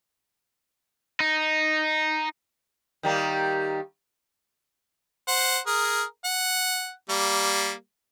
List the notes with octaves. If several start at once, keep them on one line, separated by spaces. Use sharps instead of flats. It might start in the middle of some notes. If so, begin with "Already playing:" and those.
D#4
D#3 G3 A#3
C5 F#5
G#4 A#4
F#5
G3 A#3